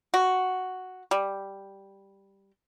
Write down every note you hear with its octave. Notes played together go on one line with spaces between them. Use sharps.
F#4
G3